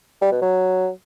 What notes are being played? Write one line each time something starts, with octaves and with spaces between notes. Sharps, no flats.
G3
B2
F#3